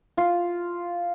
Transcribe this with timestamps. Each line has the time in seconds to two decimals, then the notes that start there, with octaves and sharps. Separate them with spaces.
0.17 F4